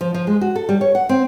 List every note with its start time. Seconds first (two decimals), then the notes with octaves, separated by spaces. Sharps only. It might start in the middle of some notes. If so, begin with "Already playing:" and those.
0.01 F3
0.14 F3
0.27 G#3
0.41 F#4
0.56 A4
0.69 G3
0.81 C#5
0.95 F#5
1.09 C4